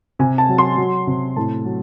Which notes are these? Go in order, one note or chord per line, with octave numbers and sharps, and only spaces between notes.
C3 G#5
A5
F#3
C6
F#3
C3
A2 A5
F#3